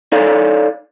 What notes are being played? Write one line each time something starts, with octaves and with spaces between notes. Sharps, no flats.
D#4 A4 C#5 D5 F5